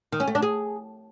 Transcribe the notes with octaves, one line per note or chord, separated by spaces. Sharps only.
D#3
C#4
A3
D4
G#4